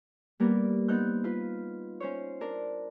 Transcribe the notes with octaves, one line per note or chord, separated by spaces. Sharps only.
G3 A#3 B3 A#4
B3 C4 D#4 F#6 G6
F4 B4
C#4 C5 C#5
D4 A#4